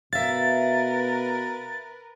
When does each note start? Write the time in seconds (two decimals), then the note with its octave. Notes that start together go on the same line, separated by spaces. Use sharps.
0.13 B2 A#4 B4 E5 F5 A6